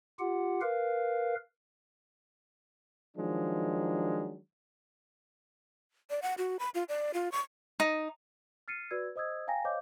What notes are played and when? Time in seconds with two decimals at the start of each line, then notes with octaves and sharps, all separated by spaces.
0.19 F4 G4 F#5
0.61 A#4 B4 F5
3.17 D#3 F3 F#3 G#3 D4
6.10 D5
6.22 F#5
6.38 F#4
6.59 B5
6.75 F4
6.89 D5
7.14 F4
7.32 C#6
7.80 D#4
8.68 F6 A6 C7 C#7 D#7
8.91 F#4 B4 D5 E6 G#6
9.16 C5 D#5 D#6 E6 G#6
9.47 F5 G5 G#5 A#5 A#6
9.65 C5 C#5 D#5 F5 D6 G6